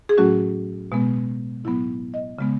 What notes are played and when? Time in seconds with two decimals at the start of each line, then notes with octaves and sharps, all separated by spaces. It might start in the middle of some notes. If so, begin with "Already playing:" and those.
0.09 G#4
0.18 A2 F#3 A3 C#4 F#4
0.92 B2 G#3 B3
1.64 A2 F#3 B3 E4
2.14 D#5
2.39 C#3 G#3 B3